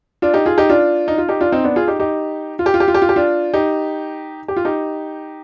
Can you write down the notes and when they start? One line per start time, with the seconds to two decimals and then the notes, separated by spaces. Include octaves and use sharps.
0.22 D4 F4
0.34 D#4 G4
0.46 F4 G#4
0.58 D#4 G4
0.70 D4 F4
1.08 D#4
1.18 F4
1.29 D#4 G4
1.40 D4 F4
1.52 C4 D#4
1.64 B3 D4
1.76 F4 G#4
1.88 D#4 G4
2.00 D#4 G4
2.59 F4
2.66 G4
2.74 F4
2.80 G4
2.88 F4
2.95 G4
3.02 F4
3.09 G4
3.16 D4 F4
3.54 D#4 G4
4.48 G4
4.57 F4
4.65 D#4 G4